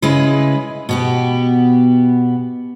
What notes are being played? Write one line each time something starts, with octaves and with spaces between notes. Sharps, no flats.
C#3 G#3 E4 G#4 B4
B2 B3 G4